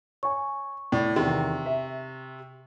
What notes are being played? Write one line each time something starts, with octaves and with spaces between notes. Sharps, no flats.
C#5 G#5 C#6
A2 D5
E2 C3 D#3
E5